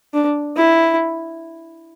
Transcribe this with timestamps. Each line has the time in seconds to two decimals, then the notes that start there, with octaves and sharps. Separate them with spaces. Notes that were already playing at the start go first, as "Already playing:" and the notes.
0.13 D4
0.56 E4